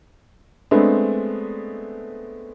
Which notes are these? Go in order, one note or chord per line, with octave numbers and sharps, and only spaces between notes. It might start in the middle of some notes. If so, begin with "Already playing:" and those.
G#3 A3 B3 C4 D4